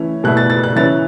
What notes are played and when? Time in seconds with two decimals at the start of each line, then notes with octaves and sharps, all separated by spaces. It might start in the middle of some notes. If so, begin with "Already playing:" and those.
Already playing: E3 A3 C#4 E4
0.24 B2 A3 E4 F#6
0.37 A6
0.50 A6
0.63 F#6
0.76 E3 C#4 E4 A6